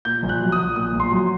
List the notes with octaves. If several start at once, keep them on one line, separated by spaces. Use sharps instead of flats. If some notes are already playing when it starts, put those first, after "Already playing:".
A#2 G6
A#1
F#6
F#3
D#6
A#1
A#2 D#6
A#1
C6
F#3